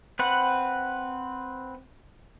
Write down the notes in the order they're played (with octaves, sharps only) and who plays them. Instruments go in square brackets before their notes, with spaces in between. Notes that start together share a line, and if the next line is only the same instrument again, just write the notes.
[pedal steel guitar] C4 B4 F#5